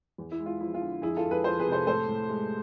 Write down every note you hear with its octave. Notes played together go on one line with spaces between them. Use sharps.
E2
E4
G#3
F4
F3 E4
F4
D3
F2 E4 G#4
F4 A4
F2
G#4 B4
F3 A4 C5
G#4 B4
C3
A4 C5
A2 A4 C5
A2
G#3